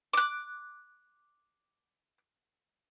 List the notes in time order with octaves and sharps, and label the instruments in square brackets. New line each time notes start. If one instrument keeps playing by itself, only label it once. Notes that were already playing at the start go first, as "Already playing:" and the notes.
[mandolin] D6 F#6